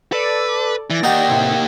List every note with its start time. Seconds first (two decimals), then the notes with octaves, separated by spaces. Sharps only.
0.12 A4 B4 D5
0.90 E3 D5 A#6
1.03 A#3 D#4 G4 F#5 G5
1.28 A2 C3